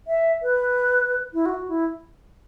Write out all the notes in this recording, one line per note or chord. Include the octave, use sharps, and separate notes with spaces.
E5
B4
E4
F#4
E4